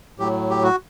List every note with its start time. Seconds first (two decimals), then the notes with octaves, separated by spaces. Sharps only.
0.19 A2 F#3 G4
0.50 G4
0.63 F#4